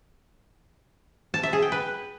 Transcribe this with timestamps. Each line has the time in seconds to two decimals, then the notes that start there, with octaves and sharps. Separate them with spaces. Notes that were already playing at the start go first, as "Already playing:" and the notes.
1.34 A5
1.43 E5
1.53 G#4
1.62 G5
1.72 B4